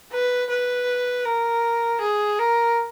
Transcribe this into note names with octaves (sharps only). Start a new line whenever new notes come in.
B4
B4
A#4
G#4
A#4